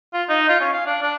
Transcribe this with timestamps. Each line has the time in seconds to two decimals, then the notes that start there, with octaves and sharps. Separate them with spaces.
0.14 F4
0.29 D#4
0.49 F4
0.61 C#4
0.73 F5
0.86 D4
1.02 D4